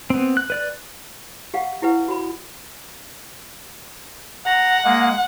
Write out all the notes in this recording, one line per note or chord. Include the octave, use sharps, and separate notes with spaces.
B3 C4
F#6
B4 D5 F#6
G4 F5 F#5
E4 G4 B4 F#5
F#4 B5
F#5 A#5
G#3 A#3